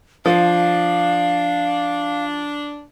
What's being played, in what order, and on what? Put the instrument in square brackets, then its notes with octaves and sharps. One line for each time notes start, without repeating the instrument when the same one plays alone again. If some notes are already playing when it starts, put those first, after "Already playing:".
[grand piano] F3 [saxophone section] D4 [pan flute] F5